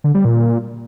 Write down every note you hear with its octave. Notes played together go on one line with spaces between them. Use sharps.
D3
G3
A#2